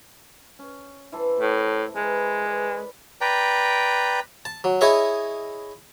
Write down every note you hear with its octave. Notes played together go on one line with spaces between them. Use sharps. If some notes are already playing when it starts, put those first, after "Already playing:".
C#4
E3 A4 C5
A2
G#3 A#4 B4
B4 D5
B4 D5 G5 A#5
A5
F#3
E4 G#4 C#5 D#5 E5